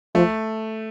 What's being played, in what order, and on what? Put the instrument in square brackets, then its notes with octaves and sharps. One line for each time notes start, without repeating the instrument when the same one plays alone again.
[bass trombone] F3 [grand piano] A3